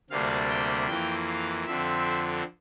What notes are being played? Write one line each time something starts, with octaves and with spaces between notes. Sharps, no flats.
D2 C3 G3 A#3 D4 F5
G5
F2 E3 A#3 G5
F5
F2 D3 F3 C4 E5